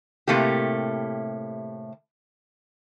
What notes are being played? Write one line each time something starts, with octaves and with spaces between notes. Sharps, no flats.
A2 C3 A3 A#3 G4